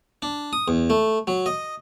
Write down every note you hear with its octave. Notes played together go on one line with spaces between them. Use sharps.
D4
D#6
E2
A3
F#3
D#5